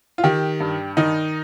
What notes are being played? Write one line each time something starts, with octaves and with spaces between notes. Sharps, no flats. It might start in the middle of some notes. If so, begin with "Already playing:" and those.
F4
D#3 G4
G2
D#3 D#4